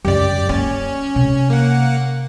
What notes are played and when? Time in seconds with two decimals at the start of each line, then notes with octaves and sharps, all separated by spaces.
0.05 F#2 C#3 G4 D5
0.49 A#3 C#4
1.16 C3
1.50 A#3 F#5